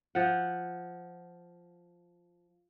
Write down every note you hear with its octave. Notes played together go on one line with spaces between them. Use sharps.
F3 F#5